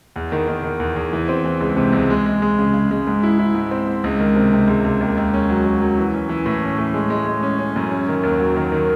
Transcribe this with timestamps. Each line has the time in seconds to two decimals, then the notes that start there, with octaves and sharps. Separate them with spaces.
0.16 E2
0.32 D#3
0.48 D#3
0.63 D#3
0.80 E2
0.96 E2
1.13 E3
1.29 C4
1.45 E3
1.61 C#2
1.77 C3
1.93 C#2
2.10 G#3
2.26 G#3
2.42 G#3
2.58 C#3
2.74 C#3
2.91 G#3
3.07 G#2
3.23 E4
3.39 E4
3.55 G#2
3.71 C4
3.87 G#2
4.04 C#2
4.20 D#3
4.36 C3
4.53 C3
4.68 C#2
4.85 C#2
5.00 D#2
5.17 D#2
5.33 C#4
5.50 F#3
5.65 D#2
5.81 F#3
5.98 E3
6.14 C#4
6.29 E3
6.46 A2
6.63 C#4
6.79 A2
6.94 G#3
7.10 G#3
7.26 G#3
7.43 C#4
7.59 C#4
7.76 F#2
7.91 C#4
8.08 D#3
8.23 D#2
8.39 F#3
8.56 D#3
8.72 D#3